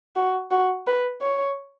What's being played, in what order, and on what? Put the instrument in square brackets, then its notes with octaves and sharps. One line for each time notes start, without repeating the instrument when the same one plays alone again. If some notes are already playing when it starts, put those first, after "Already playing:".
[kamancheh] F#4
F#4
B4
C#5